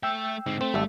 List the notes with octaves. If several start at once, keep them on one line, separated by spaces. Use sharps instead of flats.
A3 E5 G5 E6
G#2 D3 C4
A3 C4
G#1 G3 A4 E5